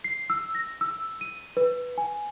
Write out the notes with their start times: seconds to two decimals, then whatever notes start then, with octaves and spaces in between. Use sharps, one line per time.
0.04 C7
0.30 E6
0.55 A#6
0.81 E6
1.21 D#7
1.57 B4
1.98 G#5